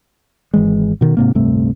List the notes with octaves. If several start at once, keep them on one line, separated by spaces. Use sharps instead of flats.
G#1 E3 G#3
B2 D#3
G#2 C3 A#3
D1 G2 C3 A3